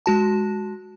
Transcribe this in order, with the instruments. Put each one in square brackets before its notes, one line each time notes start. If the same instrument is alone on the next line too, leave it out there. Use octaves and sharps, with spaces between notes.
[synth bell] G#3 F#4 A5